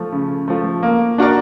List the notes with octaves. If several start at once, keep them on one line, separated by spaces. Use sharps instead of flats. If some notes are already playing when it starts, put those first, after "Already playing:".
Already playing: F3 A3
C#3
F3 A3
A#3
D4 F#4 A#4 D5